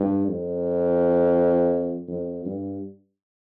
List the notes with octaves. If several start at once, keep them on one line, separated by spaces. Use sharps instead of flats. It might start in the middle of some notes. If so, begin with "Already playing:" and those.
Already playing: G2
F2
F2
G2